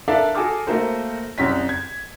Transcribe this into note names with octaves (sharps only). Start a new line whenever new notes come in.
D4 A4 A#4 D5 E5 F5
F#4 G#4 A4 D6 F6
A3 A#3 F#4 A#4 C5
C2 F#2 C#4 B6
G#6